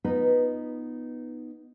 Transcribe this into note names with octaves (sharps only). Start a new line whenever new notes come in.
B3 D#4 F4 B4 D#5